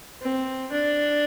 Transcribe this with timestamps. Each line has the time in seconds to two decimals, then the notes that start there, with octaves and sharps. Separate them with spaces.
0.22 C4
0.72 D4